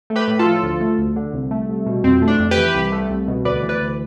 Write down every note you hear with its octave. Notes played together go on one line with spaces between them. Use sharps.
A3
G4 B4
A2
F4 A4
F3
D2
A3
D2
D3
C2
A3
C2
B2
F2 C4
A3
D4
F2
G4 B4
E3
C2
A3
C2
B2
D2 B4 D5
E3
B4 D5
D2